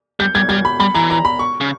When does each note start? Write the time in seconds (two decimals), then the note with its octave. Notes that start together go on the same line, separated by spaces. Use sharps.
0.20 G3 G6
0.35 G3 G#6
0.49 G3 G#6
0.65 B5
0.80 G3 B5
0.94 E3 A#5
1.10 A#5
1.25 B5
1.39 C#6
1.61 C#3